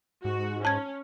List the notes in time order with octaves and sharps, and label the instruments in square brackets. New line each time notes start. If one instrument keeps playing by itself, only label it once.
[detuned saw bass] G#2 [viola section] F#4
[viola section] C#4 [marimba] A5 G#6